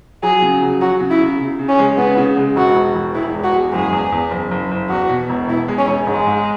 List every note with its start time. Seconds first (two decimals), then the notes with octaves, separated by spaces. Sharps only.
0.23 F#3 G#4
0.42 C#3
0.62 F#3
0.81 F#3 F#4
1.00 C#3
1.10 E4
1.21 C#3
1.40 C#3
1.59 C#3
1.68 C#4
1.79 G#3
1.98 C#3 B3
2.17 C#3
2.37 G#3
2.56 E1 F#4
2.75 E1
2.95 E1
3.15 G#3 E4
3.34 E2
3.44 F#4
3.53 G#3
3.73 F#1 G#4
3.92 E2
4.12 E2
4.31 F#1
4.51 F#1
4.71 F#1
4.89 E2 F#4
5.09 B2
5.29 E1
5.48 B2 E4
5.68 G#3
5.78 C#4
5.87 E1
6.07 G#2 G#3
6.27 G#2